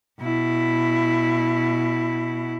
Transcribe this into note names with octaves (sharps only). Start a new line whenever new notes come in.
B2 E4